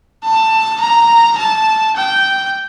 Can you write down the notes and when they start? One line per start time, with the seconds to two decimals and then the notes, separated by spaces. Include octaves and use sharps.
0.24 A5
0.80 A#5
1.38 A5
1.97 G5